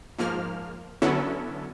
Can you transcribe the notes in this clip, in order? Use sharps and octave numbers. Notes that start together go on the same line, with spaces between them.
G#2 F3 A#3 F6
D3 F#3 B3 C#4 E4 A4